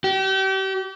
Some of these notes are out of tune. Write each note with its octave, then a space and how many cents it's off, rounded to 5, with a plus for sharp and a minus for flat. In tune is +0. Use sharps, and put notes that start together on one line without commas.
G4 -35